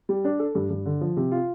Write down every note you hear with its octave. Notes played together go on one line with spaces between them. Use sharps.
G3
D4
A4
G2
G2
D3
F3
C3
F4